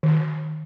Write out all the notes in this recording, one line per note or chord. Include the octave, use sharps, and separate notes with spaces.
D#3